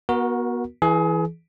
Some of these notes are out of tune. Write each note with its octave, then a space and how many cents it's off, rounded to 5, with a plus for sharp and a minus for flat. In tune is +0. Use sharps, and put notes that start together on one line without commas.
B3 -30 F#4 -10 A#4 +20
E3 +0 G#4 +30